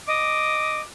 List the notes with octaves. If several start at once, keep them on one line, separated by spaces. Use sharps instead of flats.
D#5 D6